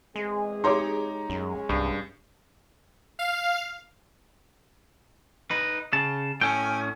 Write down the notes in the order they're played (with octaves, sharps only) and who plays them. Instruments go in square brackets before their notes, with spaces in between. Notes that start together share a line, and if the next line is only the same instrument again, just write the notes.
[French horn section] E2 C4 G#4 [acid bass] G#3
[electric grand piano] D#4 A#5 [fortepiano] G4 C#5 C6
[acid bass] F#2 [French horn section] G#3 C#4
[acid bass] C2 [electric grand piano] G2
[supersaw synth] F5
[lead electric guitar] D#4 B4
[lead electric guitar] C#3 [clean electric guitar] A5
[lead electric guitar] A2 C#4 [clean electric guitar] G5 [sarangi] G#5